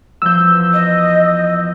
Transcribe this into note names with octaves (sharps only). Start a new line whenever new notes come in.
E2 F3 E6 G6
D#5